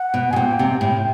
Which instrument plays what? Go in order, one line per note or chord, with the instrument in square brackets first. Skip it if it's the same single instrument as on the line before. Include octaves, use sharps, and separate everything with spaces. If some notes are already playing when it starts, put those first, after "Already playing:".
Already playing: [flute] F#5
[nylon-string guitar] B2
[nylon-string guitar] B2 [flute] G#5
[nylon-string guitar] A#2 [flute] G5
[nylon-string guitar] C3
A2